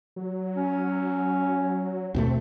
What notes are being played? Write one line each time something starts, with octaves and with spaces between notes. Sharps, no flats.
F#3
C#4
D#2 B2 A3 C4